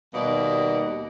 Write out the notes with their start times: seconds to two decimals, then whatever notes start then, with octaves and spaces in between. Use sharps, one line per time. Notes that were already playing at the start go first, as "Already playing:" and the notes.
0.14 D#2 B2 G3 A#3 D5 D#5